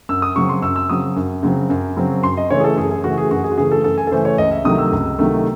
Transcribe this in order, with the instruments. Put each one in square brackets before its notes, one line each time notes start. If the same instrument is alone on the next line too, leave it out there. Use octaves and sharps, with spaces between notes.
[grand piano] F#2 E6
D#6
C#3 F#3 C4 C#6
C6
F#2 E6
E6
C#3 F#3 C4 D#6
F#2
C#3 F#3 C4
F#2
C#3 F#3 C4
F#2 C6
D#5
C#3 E3 A3 C#5
G#4
A4
F#2 G#4
G#4
C#3 E3 A3 F#4
G#4
F#2 F#4
G#4
F#4
C#3 E3 A3 G#4
A4
F#2 A4
G#5
A4
C#3 E3 A3 C5
C#5
C#2 D#5
E5
C3 D#3 F#3 A3 D#6
E6
C#2
C3 D#3 F#3 A3